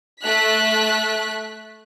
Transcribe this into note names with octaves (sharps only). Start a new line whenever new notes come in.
A3 F#6 B6